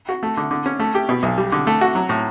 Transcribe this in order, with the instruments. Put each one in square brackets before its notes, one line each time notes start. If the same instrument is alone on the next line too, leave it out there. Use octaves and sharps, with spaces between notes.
[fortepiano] F#4
A3
D3
D3
C#4
A3
G4
B2
B1
G3
D3
A3
F#4
F#3
A2